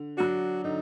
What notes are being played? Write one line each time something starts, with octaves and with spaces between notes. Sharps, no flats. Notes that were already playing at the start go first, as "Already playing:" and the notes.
Already playing: D3
F#3 D4 F#4
D3 D#4